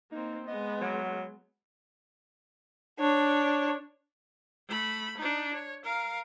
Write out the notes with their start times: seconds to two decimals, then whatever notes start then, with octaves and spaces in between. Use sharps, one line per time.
0.12 A#3 C4 D#4
0.47 G#3 B3 D#5
0.81 F#3
2.99 D4 C#5
4.68 A3 B5
5.17 D4 D#4
5.54 C#5
5.84 A#4 F5